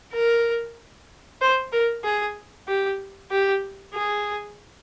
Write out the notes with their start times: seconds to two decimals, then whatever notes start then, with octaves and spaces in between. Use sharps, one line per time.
0.14 A#4
1.41 C5
1.72 A#4
2.04 G#4
2.68 G4
3.31 G4
3.95 G#4